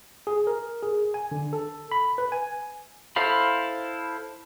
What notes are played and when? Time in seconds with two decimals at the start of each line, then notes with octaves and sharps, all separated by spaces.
0.27 G#4
0.47 A#4
0.83 G#4
1.14 G#5
1.32 D3
1.53 A4
1.92 B5
2.18 B4
2.32 G#5
3.16 E4 A4 C5 F5 B5